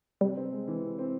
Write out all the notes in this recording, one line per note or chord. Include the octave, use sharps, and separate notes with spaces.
C3 G3
C4
G#3
E3
C3
C4